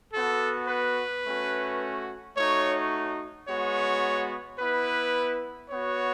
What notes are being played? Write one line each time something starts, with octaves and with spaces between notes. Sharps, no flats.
B3 F#4 A4
B4
A3 C#4 F#4
A3 D#4 F#4 C#5
G#3 B3 F#4 C#5
B3 E4 B4
B3 F#4 C#5